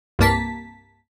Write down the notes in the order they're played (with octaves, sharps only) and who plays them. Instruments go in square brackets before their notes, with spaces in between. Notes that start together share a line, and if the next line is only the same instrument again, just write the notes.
[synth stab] C2 G2 A#3 A5 B6